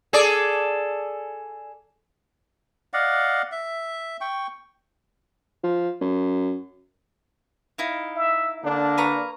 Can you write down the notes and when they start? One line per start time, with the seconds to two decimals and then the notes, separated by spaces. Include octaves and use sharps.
0.13 G#4 A4 D5
2.93 D5 D#5 F5 F#5
3.52 E5
4.21 G5 C#6
5.64 F3
6.01 F#2
7.78 D#4 E4 F5
8.16 E5
8.63 D3 A#3 D4
8.98 B4 A#5 C#6